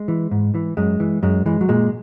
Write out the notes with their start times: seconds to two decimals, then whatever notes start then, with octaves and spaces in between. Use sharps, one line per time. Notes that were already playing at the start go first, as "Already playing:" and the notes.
Already playing: G#3
0.08 E3
0.31 G#2
0.55 E3
0.77 F#2 G#3
1.00 E3
1.23 F#2 G#3
1.46 E3 G#3
1.61 F#3
1.69 A#2 G#3